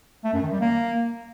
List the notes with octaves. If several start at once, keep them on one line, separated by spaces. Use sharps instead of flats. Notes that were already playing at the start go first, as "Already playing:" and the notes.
A3
F#2
D#3
G3
A#3